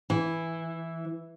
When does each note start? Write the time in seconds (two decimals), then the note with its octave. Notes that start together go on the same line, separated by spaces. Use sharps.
0.10 E3